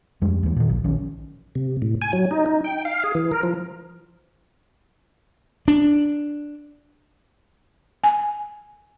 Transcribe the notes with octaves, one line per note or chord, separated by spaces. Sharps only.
F2 G3 G#3
D#2 E3
A#2 D#3
A#1
A#1 D#3 C#4
C3
A2
G#5
F#3
D#4
D#4
G5
F5
G#4
E3
A#4
F3
D4
G#5